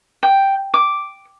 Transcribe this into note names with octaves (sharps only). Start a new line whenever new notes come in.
G5
D6